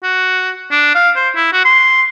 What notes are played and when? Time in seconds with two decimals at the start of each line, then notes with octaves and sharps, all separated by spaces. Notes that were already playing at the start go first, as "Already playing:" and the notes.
0.03 F#4
0.72 D4
0.95 F5
1.16 C5
1.36 E4
1.53 F#4
1.65 C6